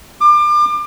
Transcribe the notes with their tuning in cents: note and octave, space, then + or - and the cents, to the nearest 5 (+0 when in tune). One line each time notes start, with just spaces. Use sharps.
D6 +30